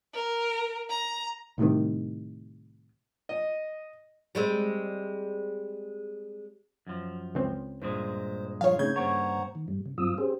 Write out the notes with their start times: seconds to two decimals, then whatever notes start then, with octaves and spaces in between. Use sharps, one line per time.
0.14 A#4
0.90 A#5
1.58 C2 A2 C3 D#3
3.29 D#5
4.35 G3 G#3 C4
6.87 F#2 F3
7.35 C#2 C4
7.82 G2 A#2 G#3 C5
8.61 F3 G3 F4 C#5 F5
8.79 C#3 A3 C4 D#4 G6 G#6
8.96 G2 A#3 C5 C#5 F#5 A#5
9.55 D#3
9.68 G2 G3
9.86 C#3
9.98 G2 F#3 C4 F4 D#6 E6
10.18 C#4 G4 G#4 C5